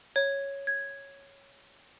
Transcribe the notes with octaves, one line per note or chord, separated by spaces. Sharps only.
C#5
G#6